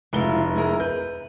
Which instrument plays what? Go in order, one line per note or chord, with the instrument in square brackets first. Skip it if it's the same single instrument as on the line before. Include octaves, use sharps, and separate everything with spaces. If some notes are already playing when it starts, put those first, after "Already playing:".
[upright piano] F1 G7 [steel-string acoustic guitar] G#3 E4 F4
[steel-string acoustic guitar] E4 G#4 A#4
[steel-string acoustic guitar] B4 [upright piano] G6